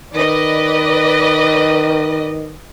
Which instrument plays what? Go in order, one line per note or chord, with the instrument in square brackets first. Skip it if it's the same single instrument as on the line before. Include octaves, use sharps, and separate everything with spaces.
[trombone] D#3 [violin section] B4 D5 D#5